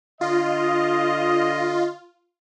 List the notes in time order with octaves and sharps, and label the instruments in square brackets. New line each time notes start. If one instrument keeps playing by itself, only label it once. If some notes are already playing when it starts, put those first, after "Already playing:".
[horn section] D3 D#5 [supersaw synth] F4